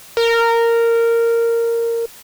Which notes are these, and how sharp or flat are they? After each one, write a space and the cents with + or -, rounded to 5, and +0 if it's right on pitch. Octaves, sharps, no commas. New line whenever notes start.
A#4 -10